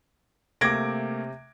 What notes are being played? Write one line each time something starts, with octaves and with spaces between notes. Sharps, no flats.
C3 A3 A#3 D6 G#6 A#6 D7